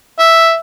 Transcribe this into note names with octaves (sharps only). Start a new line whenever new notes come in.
E5